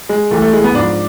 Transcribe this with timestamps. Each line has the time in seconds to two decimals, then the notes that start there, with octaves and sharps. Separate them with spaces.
0.09 G#3
0.31 C2 C3 E3 A3
0.42 A3
0.53 G#3
0.64 B3
0.74 G#2 F3 D4